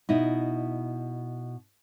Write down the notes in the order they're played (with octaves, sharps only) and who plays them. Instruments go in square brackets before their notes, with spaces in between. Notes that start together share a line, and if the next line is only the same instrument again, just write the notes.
[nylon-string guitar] B2 D#4 E4